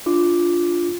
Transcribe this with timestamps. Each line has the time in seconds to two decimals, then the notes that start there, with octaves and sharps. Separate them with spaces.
0.06 D4 F4 D6